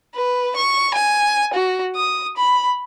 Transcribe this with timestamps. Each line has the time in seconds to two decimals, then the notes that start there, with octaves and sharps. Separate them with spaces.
0.15 B4
0.56 C#6
0.94 G#5
1.54 F#4
1.96 D#6
2.37 B5